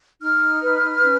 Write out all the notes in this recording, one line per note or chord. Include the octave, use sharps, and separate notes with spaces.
D#4 F6
B4
C#4